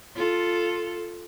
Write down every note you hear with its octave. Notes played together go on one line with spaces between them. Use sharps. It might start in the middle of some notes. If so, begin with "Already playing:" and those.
F4 A4